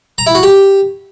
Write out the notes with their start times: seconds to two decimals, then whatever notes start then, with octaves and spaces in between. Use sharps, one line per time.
0.18 A#5
0.26 E4
0.35 F#4
0.43 G4